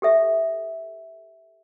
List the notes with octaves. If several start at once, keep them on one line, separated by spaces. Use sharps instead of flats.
G4 A4 E5